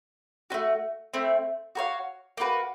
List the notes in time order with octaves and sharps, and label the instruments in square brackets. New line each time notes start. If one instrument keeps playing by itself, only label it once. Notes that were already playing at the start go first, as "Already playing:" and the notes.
[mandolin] A3 C#4 F#4
A3 C4 E4
F#4 A#4 C#5 F5
A#3 D#4 F#4 B4